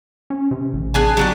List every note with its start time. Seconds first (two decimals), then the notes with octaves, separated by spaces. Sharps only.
0.30 C#4
0.51 C3
0.73 A1
0.94 D4 G#4 G#5
1.17 F#3 D4 G4